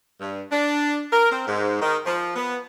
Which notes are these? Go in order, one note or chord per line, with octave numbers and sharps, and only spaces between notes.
G2
D4
A#4
C4
G#2
D#3
F3
B3